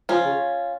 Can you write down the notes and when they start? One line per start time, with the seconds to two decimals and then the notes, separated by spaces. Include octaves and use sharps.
0.09 F3 C#4 F4
0.25 C#3